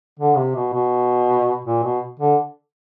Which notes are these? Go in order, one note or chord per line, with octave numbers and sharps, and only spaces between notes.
D3
C3
B2
B2
A#2
B2
D3